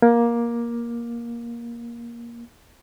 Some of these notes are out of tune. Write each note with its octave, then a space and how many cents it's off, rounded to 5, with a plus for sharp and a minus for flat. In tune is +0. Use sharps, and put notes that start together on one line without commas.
A#3 +15